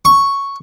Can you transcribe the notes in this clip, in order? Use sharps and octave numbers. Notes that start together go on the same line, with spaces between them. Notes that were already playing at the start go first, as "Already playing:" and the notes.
C#6